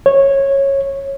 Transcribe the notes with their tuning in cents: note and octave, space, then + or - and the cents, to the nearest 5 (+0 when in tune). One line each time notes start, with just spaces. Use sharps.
C#5 -15